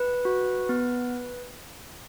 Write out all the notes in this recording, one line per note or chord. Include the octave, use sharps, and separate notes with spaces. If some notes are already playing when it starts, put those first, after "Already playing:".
Already playing: B4
F#4
B3